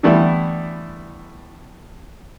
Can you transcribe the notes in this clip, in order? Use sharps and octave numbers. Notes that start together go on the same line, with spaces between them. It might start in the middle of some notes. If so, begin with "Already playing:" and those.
D3 E3 G3 A3 B3 E4